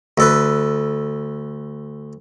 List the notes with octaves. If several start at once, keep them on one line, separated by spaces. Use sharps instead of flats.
D2 A4 B4